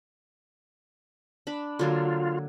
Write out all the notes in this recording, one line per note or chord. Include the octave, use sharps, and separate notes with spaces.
D4 B5
D3 F#3 A#3 F4